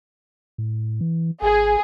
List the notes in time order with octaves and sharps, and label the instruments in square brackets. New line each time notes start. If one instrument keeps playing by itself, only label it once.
[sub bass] A2
E3
[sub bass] G#1 [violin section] G#4